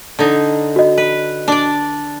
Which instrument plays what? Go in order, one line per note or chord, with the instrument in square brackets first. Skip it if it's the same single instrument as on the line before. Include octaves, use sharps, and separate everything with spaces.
[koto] D3 D#4
[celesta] F#4 D#5
[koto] B4
D4 D5